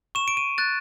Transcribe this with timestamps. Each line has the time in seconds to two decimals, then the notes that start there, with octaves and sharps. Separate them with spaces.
0.15 C#6 E7
0.28 D7
0.37 D#7
0.58 F#6 A6